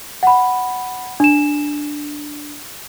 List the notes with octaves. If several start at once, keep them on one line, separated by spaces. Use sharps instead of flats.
F#5 B5
D4 E7